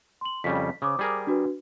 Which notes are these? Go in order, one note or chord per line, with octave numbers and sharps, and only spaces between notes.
C6 F#7
F2 C#3 G3 B6
C#3 C5 D6 D#6
G3 G#4 A#4
D4 F#4 B4